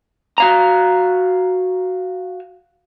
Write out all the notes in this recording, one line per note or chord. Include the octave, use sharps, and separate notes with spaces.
F#4 F5 A#5